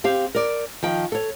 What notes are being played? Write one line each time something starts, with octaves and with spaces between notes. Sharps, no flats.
C4 G4 F5
A#4 D5
D#3 F3 G5
A4 C#5